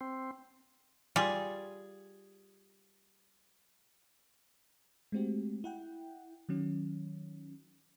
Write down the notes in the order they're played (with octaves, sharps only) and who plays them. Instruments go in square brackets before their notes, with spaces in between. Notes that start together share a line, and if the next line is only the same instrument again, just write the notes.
[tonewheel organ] C4
[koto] G3 [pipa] F4 G#4
[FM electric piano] G#3 A3 C4 F#4 G4
E4 F#5 G5
D#3 F#3 C#4